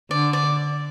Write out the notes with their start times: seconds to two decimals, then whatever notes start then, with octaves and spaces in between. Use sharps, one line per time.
0.11 D3 D5
0.33 D5